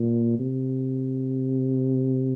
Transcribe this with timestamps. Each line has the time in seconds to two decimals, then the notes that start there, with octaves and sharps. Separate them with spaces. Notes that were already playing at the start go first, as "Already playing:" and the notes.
Already playing: A#2
0.39 C3